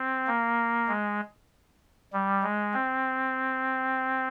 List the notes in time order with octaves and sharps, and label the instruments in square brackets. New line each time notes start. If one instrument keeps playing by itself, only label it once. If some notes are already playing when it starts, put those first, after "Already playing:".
Already playing: [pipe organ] C4
A#3
G#3
G3
G#3
C4